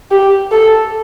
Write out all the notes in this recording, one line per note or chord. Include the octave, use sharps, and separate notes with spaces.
G4
A4